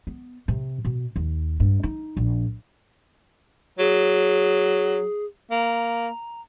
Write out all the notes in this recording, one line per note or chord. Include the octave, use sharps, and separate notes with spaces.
B3
C3
B2
D#2
G2
D#4
A#1
F#3 G#4
A#3 A#5